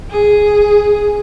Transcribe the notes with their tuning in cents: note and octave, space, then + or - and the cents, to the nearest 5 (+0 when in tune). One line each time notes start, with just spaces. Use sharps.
G#4 +0